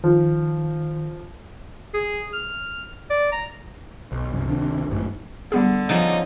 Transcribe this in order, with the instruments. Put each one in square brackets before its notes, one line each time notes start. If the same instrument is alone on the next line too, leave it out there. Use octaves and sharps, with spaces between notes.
[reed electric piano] D#3 [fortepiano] F3
[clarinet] G#4
F6
D5
A#5
[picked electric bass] B1
C2 F#2
C#2 C3 D#3 D4
G#1 F#2 A2
[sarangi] D3 [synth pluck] G3 B3 G#4
[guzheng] C#3 F3 [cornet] D#4